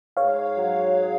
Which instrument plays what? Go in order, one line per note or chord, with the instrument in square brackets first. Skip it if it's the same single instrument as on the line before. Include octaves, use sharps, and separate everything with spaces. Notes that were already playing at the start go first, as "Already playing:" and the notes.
[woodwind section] G#2 [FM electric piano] C#5 F5
[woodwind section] F#3
G#4